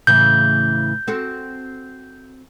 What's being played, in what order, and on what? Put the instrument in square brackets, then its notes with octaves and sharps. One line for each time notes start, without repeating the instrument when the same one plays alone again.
[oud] A2 C#3 E3 [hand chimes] G6
[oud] C4 F#4 A4